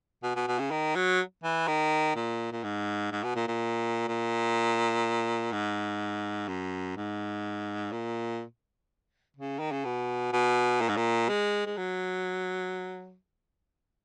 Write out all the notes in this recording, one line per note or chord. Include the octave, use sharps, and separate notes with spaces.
B2
B2
B2
C#3
D#3
F#3
E3
D#3
A#2
A#2
G#2
G#2
B2
A#2
A#2
A#2
G#2
F#2
G#2
A#2
C#3
D#3
C#3
B2
B2
A#2
G#2
A#2
G#3
G#3
F#3